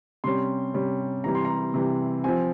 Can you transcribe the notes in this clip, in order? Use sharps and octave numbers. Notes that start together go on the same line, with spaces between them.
C3 G3 C#4 C6
C3 G3 C#4
C3 E3 G3 A#5
C6
A#5
C3 E3 G3
F3 C4 G#5